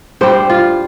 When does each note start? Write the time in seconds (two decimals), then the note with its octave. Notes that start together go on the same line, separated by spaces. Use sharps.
0.21 G2 G3 C5
0.50 F4